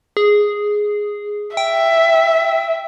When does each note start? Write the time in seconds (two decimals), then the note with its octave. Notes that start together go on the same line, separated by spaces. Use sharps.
0.17 G#4
1.57 E5 G5